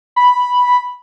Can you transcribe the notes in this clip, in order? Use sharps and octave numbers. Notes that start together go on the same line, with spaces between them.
B5